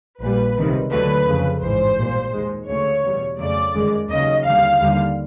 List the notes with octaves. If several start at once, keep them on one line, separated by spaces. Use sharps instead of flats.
A#1 A#2 G3 B4
C#2 C3 D#3 G3
D2 D3 F#3 A3 B4
F2 C#3 F3
A1 G#2 E3 C5
B1 A#2 G3
D#2 D#3 G#3
D2 C#3 F#3 A3 C#5
E2 B2 G3
F2 C#3 F#3 A3 D5
G1 F#2 D#3 G#3
D#2 C#3 F#3 D#5
D#2 D3 G3 F5
D#2 D3 G3